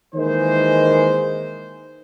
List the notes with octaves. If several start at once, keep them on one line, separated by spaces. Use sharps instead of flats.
D#3 E3 G#3 A#3 C5